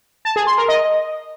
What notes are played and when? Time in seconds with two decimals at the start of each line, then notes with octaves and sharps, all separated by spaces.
0.25 A5
0.36 G#4
0.47 C6
0.58 A#4
0.69 D#5